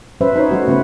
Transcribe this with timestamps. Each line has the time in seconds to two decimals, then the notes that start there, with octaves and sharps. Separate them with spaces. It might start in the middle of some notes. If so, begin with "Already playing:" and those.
0.21 F#3 C#4 B4 C5 E5
0.36 D#4 C5 C#5
0.51 F#3 A3 F#4
0.68 C#3 B3 B4 C5